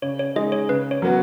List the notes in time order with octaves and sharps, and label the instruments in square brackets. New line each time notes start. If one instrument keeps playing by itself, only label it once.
[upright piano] C#3 [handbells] C#5
[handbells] C#5
[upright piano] G#3 D#4 [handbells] D#5
[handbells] C#5
[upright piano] C#3 [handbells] B4
[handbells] C#5
[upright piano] F#3 B3 F#4